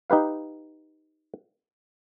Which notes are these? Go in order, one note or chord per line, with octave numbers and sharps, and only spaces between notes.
D#4 G4 B4 F5